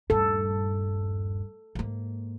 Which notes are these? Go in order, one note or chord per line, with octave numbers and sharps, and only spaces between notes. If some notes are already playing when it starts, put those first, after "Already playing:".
D#1 G2 A4
G#2 A#3